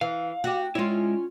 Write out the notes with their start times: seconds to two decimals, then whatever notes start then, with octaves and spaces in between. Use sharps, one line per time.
0.01 E3 F5
0.44 F#4 G4
0.75 G#3 C#4 E4 F4